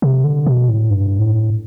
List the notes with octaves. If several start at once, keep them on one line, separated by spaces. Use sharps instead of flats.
C3
D3
B2
A2
G2
A2